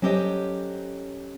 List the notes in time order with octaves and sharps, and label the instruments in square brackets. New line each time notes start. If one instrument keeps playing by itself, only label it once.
[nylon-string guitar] F#3 C#4 G4 A4 C5 D#5